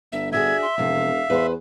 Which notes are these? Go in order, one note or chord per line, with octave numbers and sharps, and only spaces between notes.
G1 E5
D4 F#4 G#4 E5 G#6
C6
E1 F2 C3 F5
E2 B4 C5